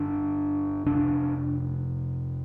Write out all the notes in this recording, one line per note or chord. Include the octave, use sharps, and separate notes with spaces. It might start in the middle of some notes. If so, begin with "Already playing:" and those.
Already playing: G2 D3 D4
F2 C3 D4